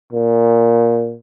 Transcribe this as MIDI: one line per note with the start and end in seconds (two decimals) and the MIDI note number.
0.13 1.16 46